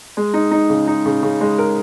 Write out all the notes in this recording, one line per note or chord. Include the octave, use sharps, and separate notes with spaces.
G#3
D#4
D#4
C#3
D#4
C#3
C#3
G#3
A#4